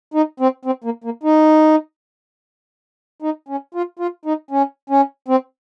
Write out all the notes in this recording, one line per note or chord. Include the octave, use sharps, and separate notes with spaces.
D#4
C4
C4
A#3
A#3
D#4
D#4
C#4
F4
F4
D#4
C#4
C#4
C4